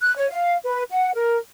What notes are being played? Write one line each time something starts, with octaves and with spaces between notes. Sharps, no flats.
F#6
C#5
F5
B4
F#5
A#4